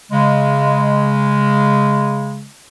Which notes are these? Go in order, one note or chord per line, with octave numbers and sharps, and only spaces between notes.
C#3 G#3